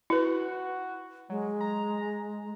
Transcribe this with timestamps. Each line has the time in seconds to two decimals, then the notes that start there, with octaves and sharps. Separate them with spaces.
0.10 E4 F#4 B4
1.30 F#3 G#3
1.61 A#5